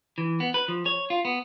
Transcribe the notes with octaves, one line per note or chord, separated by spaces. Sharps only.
E3
B3
B4
F3
C#5
F4
B3